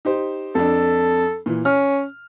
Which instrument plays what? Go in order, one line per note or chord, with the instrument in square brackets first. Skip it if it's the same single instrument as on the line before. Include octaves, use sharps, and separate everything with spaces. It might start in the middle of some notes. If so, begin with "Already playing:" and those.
[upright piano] D#4 G4 C5
[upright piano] F2 D4 [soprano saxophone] A4
[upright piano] A#2 E3
[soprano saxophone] C#4 [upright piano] F6